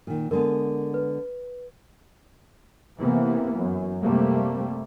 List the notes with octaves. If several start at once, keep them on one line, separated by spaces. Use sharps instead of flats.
A#2 D#3
D3 G#3 B3 A#4
B4
C3 E3 A#3 B3
F#2
C3 G3 A3 A#3